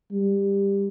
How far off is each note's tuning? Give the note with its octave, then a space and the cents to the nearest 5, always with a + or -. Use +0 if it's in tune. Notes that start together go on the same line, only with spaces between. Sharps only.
G3 +15